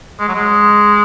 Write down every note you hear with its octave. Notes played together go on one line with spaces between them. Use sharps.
G#3
F#3
G#3